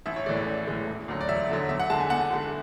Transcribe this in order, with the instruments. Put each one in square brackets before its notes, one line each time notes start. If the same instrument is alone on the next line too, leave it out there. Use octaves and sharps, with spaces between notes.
[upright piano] A1 E5
C#5
A2 E3 G#3 D5
D5
A1
A2 E3 G#3
E1
D2 D3 F#3
D5
E1 E5
D2 D3 F#3
E2 E5
F#5
D3 G#3 A5
G#5
E2 F#5
D3 G#3